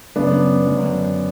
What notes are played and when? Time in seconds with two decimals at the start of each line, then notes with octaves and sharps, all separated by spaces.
0.16 F#2 C#3 B3 D4
0.67 F#2 D3